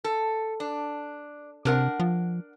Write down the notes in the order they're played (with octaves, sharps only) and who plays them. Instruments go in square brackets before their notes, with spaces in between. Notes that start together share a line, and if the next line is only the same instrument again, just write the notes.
[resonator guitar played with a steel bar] A4
D4
[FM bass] C3 [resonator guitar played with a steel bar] D4 A#4 F#5
[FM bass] F3